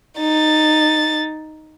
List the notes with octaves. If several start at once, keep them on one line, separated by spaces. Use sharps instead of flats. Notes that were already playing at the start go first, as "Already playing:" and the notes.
D#4 A6